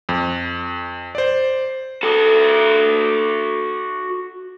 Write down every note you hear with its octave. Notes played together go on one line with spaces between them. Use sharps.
F2
C5 D5
F#4 A4